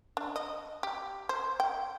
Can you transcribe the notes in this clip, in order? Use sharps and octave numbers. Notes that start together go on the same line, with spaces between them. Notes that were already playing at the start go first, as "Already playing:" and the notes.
D4
D#5
G4
C5
G5